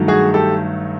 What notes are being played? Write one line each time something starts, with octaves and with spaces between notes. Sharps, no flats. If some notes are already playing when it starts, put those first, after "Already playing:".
Already playing: G2 D#3 F#3 A3
F#4 G#4
G4 A4